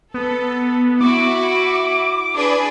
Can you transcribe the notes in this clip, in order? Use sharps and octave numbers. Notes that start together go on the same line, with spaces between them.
B3 A4
E4 F#4 D6
D4 G#4 B4